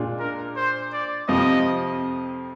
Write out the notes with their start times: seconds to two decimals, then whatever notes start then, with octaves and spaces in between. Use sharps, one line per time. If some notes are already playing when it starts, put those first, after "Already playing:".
Already playing: A#2 G#3 D4 F4
0.19 A#4
0.56 C5
0.93 D5
1.28 F2 C3 F3 C4 F4 D#5